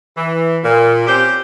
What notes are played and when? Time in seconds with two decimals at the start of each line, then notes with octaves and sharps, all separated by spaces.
0.17 E3
0.64 A#2
1.07 C4 C#4 G4 C5